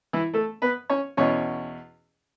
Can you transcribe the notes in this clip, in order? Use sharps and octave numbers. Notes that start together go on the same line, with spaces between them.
E3 E4
A3 A4
B3 B4
C#4 C#5
E2 B2 C#4 C#5